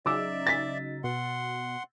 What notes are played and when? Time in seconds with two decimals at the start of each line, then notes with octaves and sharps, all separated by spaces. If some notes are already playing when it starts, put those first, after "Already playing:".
0.06 C#3 F#3 D#4 D5 E5 D6 E6
0.47 A6 B6
1.04 B2 F#5 C6